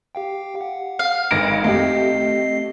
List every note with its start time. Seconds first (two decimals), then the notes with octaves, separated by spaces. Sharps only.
0.15 G4 F5 G5
0.61 F#5
0.99 F5
1.31 G#1 A#6 D7
1.64 A3 C4 G4 D#5 C7